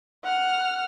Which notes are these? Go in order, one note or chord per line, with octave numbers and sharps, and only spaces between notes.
F#5 F6